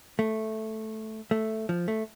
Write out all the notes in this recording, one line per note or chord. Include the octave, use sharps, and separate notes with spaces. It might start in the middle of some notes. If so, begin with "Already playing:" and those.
A3
A3
F3
A3